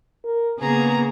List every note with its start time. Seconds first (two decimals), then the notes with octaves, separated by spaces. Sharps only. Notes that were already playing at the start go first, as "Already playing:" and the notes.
0.25 A#4
0.60 C#3 A#3 B3 G#4 A#5